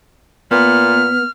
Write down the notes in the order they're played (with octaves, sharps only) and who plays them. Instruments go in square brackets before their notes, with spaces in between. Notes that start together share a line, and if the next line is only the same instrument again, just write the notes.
[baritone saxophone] A#2 [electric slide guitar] B3 [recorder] F6